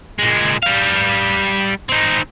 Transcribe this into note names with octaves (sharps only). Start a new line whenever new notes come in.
A#2 G#3
G3 F5
C4 D#4